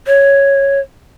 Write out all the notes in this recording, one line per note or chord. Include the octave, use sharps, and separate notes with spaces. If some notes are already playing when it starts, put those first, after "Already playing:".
C#5